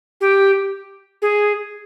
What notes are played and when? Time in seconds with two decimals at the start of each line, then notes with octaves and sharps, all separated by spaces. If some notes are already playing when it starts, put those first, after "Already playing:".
0.21 G4
1.22 G#4